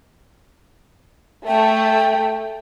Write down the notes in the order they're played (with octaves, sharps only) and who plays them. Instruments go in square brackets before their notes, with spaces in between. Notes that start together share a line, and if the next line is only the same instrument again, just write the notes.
[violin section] A3 [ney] G5